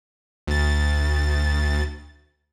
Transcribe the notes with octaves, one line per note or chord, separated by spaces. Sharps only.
D2 A6